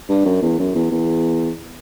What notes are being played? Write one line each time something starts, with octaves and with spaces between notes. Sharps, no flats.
G2
F#2
E2
F#2
E2
E2